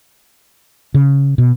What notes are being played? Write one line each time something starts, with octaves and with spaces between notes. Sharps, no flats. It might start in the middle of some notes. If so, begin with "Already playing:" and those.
C#3
B2